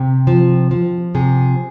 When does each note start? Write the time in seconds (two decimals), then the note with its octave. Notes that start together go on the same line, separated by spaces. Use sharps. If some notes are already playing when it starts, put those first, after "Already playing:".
Already playing: C3 G4
0.27 F3
0.71 F3
1.15 C3 G#4